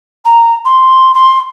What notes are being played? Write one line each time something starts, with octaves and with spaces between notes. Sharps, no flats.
A#5
C6
C6